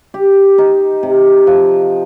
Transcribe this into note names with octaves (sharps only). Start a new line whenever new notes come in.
G4
D#4
C3
F3